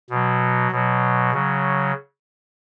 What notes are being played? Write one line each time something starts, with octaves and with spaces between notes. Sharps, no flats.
B2 F#3
B2 F#3
C#3 F#3